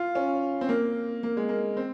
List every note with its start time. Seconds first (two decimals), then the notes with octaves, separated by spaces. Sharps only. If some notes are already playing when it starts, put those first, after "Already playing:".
Already playing: F4
0.15 C#4
0.61 C4
0.69 A#3
1.23 A#3
1.37 G#3
1.49 A#3
1.77 C4